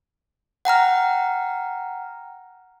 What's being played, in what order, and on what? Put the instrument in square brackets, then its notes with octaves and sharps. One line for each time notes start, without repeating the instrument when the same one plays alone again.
[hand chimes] F#5 G5 A#5 F6